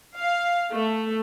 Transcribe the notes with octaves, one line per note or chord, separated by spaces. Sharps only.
F5
A3